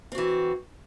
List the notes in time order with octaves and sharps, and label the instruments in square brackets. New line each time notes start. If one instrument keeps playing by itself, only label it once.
[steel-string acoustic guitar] C4
F#4
E3